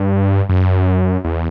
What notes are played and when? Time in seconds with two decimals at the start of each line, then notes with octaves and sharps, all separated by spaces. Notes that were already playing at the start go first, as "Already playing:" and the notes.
Already playing: G2
0.49 F#2
1.24 E2